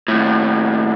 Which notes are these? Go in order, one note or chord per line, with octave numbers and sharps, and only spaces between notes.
D#2 A2